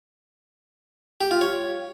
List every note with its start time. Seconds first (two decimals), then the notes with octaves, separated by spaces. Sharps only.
1.21 G4
1.31 F4
1.41 C#5